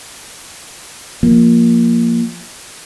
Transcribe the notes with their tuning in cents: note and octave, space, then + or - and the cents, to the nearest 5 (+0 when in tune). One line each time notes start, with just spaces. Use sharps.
F3 +0 A#3 +0